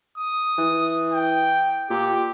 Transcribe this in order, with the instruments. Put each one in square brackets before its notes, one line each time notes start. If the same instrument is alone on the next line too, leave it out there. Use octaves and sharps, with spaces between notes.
[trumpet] D#6
[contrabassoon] E3
[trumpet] G5
[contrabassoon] A#2 [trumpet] G4